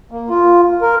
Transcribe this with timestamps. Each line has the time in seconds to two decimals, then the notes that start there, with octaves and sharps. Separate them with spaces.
0.11 A#3
0.30 F4
0.82 A#4